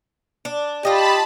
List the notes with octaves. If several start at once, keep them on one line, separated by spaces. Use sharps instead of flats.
D4
F4 G4 D#5 A5 B5